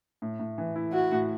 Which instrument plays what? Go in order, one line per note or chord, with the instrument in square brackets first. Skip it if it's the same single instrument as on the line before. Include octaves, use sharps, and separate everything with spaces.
[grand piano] A2
A2
E3
E4
[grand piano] E4 [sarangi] F#4
[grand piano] A2